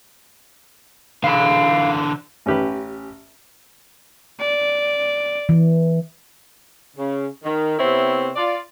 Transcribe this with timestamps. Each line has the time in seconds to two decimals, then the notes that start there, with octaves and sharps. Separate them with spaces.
1.24 D3 E3 F5 B5
2.46 A1 C#4 G4 B4
4.40 D5
5.49 E3
6.96 C#3
7.44 D#3
7.79 C3 B3 C4 E4 C#5
8.36 F4 D5